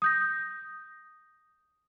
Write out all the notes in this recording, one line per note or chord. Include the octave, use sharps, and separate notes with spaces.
D#6 G6 A#6